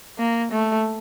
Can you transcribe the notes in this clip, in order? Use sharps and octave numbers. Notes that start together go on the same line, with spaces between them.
A#3
A3